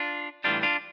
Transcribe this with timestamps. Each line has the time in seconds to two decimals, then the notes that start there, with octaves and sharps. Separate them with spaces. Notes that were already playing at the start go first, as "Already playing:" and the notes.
Already playing: D4 F4
0.44 A2 E3 G3 D4 F4
0.63 D4 F4